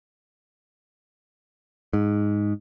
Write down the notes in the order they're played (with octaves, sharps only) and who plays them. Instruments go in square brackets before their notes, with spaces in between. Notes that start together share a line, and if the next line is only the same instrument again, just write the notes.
[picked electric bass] G#2